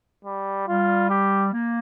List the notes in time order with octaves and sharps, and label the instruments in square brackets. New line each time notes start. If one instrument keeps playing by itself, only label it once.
[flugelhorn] G3
[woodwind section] G3 [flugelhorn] F4
[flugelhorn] G4
[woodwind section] A#3